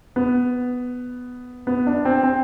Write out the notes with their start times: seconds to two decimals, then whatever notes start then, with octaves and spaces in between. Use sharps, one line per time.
0.16 B3
1.67 B3
1.87 D4
2.05 C4
2.23 C4